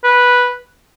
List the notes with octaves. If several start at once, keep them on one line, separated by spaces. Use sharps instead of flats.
B4